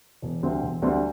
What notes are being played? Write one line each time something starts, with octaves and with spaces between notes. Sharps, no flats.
E1
D2 D3 G3 C4
E1
D2 D3 G3 C4